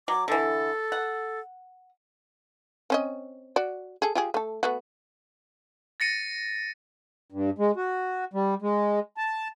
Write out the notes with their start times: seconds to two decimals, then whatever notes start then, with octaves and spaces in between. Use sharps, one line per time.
0.08 F#3 D6
0.28 D3 E3 A4
0.92 F#5
2.90 C4 C#4 D#5
3.56 F#4 D5
4.02 G#4 A4
4.15 F4 G4 G#4
4.34 A3 A4
4.63 A3 B3 F#4
6.00 A6 A#6 C#7 D#7
7.32 G2
7.58 G#3
7.76 F#4
8.33 G3
8.62 G#3
9.17 A5